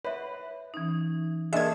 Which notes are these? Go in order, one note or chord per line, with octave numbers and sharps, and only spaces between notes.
B4 C#5 E5
E3 C#4 D#4
A#3 D4 G#4 A4 D#5 E5 G#6